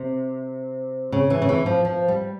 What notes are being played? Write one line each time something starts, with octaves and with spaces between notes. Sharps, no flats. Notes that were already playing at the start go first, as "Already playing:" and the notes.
Already playing: C3
C#3
E3
C#3
E3
F3
F3
G3